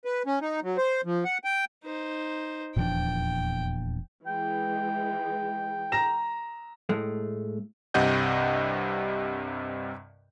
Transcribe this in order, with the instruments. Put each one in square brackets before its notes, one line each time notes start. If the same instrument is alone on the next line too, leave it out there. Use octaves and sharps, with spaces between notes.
[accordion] B4
C#4
D#4
F#3
C5
F3
F#5
G5
[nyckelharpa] D#4 C5
[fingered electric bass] D#1 E2 [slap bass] A#2 F3 D4 [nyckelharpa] G5
[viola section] E3 G#3 [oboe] G5
[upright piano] A#5 A#6 E7
[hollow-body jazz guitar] A2 G#3 A3
[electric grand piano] C2 G2 C3 D#5 F#5 G6